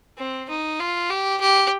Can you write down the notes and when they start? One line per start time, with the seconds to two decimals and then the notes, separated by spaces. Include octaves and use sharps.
0.18 C4
0.49 D#4
0.80 F4
1.10 G4
1.41 G4